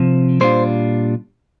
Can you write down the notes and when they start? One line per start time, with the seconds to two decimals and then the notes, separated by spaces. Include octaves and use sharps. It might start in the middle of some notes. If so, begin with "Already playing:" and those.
Already playing: C3 F3 C4
0.41 A#2 G3 D4 F4 C5